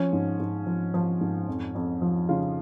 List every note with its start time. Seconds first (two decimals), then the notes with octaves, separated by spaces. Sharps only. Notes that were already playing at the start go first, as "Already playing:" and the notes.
Already playing: F3 C#4
0.13 G#2
0.40 G#2
0.67 F3
0.94 F3
1.21 G#2
1.48 F2
1.75 F2
2.02 F3
2.29 C#3 F4